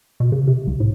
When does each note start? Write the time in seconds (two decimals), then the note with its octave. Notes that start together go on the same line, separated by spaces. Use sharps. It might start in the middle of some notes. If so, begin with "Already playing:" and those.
0.20 B2
0.32 C#3
0.47 C3
0.67 C2
0.80 A2